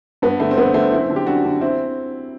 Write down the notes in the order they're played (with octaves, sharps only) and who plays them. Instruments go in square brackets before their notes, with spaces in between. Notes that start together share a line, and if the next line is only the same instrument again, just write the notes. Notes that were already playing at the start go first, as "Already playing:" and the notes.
[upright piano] G2 B3
D3 A3
C4
G2 B3
D3 A3 C4
F#2 C4 E4
D3
G4
F#2 D4 F#4
D3
C4 E4